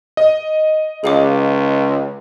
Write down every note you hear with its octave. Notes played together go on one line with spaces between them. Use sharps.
D#5
C#2 G#4 F5 D6